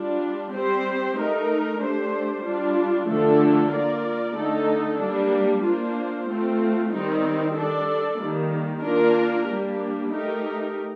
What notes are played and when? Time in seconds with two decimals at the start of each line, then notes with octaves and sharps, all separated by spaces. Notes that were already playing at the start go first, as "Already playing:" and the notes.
Already playing: G3 D4 F4
0.51 G3 C4 G4 C5
1.15 A3 D#4 A#4
1.79 A3 D4 G4 C5
2.43 G3 D4 F4
3.07 D3 F3 A3 D4 A4
3.71 A#3 F4 A#4 D5
4.35 D3 A3 D#4 A4
4.98 G3 A#3 D4
5.63 A#3 D4 F4 C5
6.28 A3 C4 F4
6.91 D#3 G3 C4 D#4
7.55 G3 D4 A4 D5
8.19 D#3 G3 A#3
8.83 A#3 D4 F4 A#4
9.47 G3 A#3 D4 G4
10.10 A3 D#4 G4 A#4